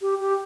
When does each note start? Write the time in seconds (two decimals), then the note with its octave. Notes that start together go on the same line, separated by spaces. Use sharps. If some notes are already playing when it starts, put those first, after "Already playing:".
0.01 G4
0.20 G4